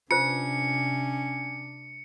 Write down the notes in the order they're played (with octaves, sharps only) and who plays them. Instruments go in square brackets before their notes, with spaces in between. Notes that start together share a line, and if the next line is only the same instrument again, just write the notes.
[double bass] C3 D4 [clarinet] C#4 [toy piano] F4 B4 C5 [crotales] C#7